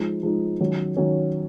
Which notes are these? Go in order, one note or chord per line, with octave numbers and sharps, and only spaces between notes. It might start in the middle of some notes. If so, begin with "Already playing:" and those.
Already playing: F3 G#3 D#4
F3 G#3 D#4
D#3 F#3 C#4
D#3 F#3 C#4